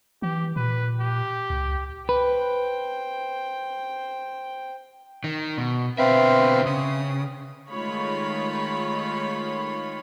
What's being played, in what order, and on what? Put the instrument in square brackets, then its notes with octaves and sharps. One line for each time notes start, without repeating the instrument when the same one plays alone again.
[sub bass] E3 [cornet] G4
[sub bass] A#2 [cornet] B4
[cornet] G4
[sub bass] C#2
[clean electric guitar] B4 [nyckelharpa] C5 G5
[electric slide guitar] D#3
B2
[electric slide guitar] B2 D3 E5 [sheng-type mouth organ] C4 B4 F5
[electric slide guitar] C#3 [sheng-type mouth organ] D#6
[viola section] D#3 G#3 A3 F4 C#5 B5